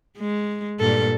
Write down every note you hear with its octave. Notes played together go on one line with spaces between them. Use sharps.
G#3
G2 A#2 A4